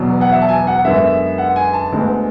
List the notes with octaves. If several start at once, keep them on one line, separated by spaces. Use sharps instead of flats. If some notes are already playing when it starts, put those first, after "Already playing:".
Already playing: E1 E2 B2 F#3 D5
F#5
E5
A5
G#5
F#5
F#2 D3 G#3 B3 E5
F#5
G#5
A5
D2 D3 G#3 B3